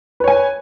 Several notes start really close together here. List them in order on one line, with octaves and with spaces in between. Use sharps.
B4 C#5 G#5